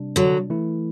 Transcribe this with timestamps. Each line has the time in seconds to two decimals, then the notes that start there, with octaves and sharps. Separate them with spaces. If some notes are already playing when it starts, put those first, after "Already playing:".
Already playing: C3 G3 D4
0.16 D3 F#3
0.50 E3 A3 E4